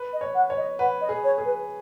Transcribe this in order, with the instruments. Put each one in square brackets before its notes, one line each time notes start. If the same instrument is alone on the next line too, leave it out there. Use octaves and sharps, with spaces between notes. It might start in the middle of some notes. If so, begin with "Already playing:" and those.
Already playing: [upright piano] B4
[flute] D#5
[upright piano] C#5
[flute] F#5
[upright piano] C#5
[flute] D#5
[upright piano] B4 [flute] F#5
[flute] D#5
[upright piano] G#4
[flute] C#5
[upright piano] G#4
[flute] B4